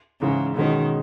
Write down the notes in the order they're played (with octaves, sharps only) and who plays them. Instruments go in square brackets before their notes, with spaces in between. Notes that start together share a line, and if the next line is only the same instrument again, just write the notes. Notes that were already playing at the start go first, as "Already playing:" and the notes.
[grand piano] G#2 E3 G#3 [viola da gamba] C#3
[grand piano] B2 G#3 C#4 [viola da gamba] D#3